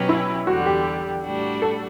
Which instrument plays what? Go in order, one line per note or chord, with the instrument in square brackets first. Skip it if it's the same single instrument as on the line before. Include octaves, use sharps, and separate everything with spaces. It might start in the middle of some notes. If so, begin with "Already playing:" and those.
Already playing: [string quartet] B2 F#3 C#4 G4 B4
[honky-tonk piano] E4
[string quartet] E2 D3 G3 [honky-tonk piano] F#4
[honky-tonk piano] G4
[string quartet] A2 G3 D4 F#4
[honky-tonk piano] A4